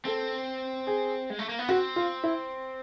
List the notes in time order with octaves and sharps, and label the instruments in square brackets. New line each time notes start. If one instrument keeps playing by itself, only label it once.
[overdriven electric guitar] C4 [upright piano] A4
[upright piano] G#4
[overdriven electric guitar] G#3
A3
A#3
B3
[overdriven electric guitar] C4 [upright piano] F#4
[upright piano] F4
E4